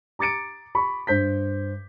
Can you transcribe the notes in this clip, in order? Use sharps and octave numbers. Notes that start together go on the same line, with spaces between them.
A#5 D6 A6 C#7 D7
B5 C#6
G2 C5 G6 B6